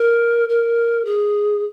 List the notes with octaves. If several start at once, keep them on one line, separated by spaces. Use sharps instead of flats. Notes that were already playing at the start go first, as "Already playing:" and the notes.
Already playing: A#4
A#4
G#4